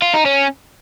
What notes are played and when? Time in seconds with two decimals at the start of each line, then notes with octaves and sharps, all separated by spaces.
0.02 F4
0.14 D#4
0.26 C#4